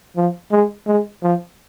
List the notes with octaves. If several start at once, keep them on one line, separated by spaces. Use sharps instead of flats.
F3
G#3
G#3
F3